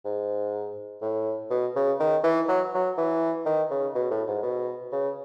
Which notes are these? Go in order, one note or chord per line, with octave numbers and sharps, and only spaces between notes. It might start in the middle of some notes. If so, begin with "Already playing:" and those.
G#2
A2
B2
C#3
D#3
E3
F#3
F#3
E3
D#3
C#3
B2
A2
G#2
B2
C#3